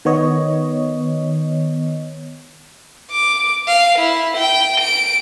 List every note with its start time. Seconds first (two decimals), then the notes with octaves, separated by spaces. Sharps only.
0.05 D#3 B3 C#5 D#5
3.11 D6
3.67 F5
3.98 E4
4.37 G5
4.80 D7